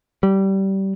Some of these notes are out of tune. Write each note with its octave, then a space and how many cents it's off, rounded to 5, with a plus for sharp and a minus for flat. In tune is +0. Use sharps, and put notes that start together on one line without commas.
G3 -20